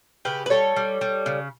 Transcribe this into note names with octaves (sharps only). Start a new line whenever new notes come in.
C#3 G4 B4
B4
G3 A4 C#5
G3
G3
C#3